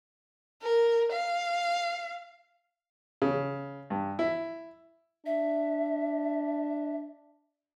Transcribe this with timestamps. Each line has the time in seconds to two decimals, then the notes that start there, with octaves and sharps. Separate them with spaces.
0.63 A#4
1.12 F5
3.22 C#3
3.90 G2
4.19 E4
5.26 D4 E5